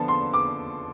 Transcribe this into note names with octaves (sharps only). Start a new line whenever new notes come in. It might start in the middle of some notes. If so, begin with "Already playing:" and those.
Already playing: D3 F3 B3 A5
C6
D6